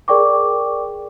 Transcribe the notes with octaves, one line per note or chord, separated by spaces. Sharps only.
G#4 A#4 D5 G5 C#6 D6